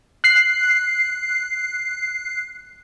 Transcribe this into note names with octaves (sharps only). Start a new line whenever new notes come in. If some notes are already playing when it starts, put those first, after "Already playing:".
F#6 C7